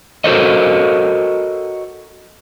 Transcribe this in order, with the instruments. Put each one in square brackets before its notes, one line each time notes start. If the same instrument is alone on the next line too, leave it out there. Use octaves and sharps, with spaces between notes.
[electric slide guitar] F#4 A4 A#4 C5 C#5 D#5